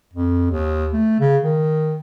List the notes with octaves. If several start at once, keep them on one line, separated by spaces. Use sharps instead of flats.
F2
D#2
A3
C#3
D#3